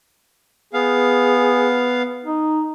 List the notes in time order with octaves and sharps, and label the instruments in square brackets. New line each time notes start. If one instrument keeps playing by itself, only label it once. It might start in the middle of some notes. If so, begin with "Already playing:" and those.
[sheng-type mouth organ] B3 F5 [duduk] G#4
[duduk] D#4